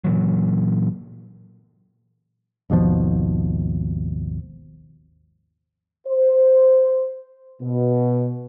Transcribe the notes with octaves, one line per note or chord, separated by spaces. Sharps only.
A#2 E3 F#3
G#1 D#2 B2 F3
C5
B2